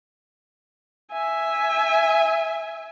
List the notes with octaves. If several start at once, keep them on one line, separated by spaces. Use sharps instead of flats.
E5 G#5